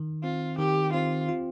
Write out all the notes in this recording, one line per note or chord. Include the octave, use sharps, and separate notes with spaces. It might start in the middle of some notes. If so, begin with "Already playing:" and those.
Already playing: D#3
C4 F4
D#3 G4
C4 F4
F4